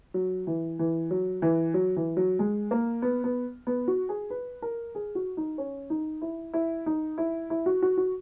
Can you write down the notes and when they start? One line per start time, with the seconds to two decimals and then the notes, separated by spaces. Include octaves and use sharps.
0.14 F#3
0.47 E3
0.79 E3
1.11 F#3
1.42 E3
1.74 F#3
1.96 E3
2.17 F#3
2.39 G#3
2.71 A#3
3.02 B3
3.24 B3
3.67 B3
3.88 F#4
4.09 G#4
4.30 B4
4.62 A#4
4.95 G#4
5.15 F#4
5.37 D#4
5.58 C#4
5.90 D#4
6.22 E4
6.53 E4
6.86 D#4
7.18 E4
7.50 E4
7.66 F#4
7.82 F#4
7.97 F#4